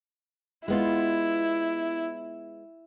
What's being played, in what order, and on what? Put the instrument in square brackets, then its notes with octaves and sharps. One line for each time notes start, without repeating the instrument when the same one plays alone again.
[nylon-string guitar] G#3 B3 F4 [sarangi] E4